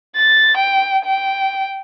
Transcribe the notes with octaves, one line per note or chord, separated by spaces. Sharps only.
A6
G5
G5